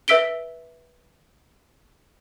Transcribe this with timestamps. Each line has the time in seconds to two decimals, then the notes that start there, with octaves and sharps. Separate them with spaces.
0.08 B4 E5 E6 B6 D7 G7